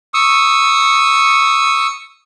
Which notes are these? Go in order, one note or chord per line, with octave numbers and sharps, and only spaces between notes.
C#6 D#6 E6